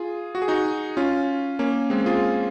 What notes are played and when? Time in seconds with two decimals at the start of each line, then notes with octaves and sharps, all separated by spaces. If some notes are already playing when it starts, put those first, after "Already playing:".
Already playing: F4 G#4
0.35 F#4
0.42 G#4
0.48 D#4 F#4
0.97 C#4 F4
1.59 A#3 C#4
1.90 G#3 C4
2.06 F4 G#4